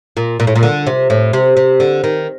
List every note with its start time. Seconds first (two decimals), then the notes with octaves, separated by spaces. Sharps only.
0.17 A#2
0.40 A#2
0.47 A2
0.55 A#2
0.63 D3
0.87 C3
1.10 A2
1.33 C3
1.57 C3
1.80 D3
2.04 D#3